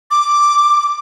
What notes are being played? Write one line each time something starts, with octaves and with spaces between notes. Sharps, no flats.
D6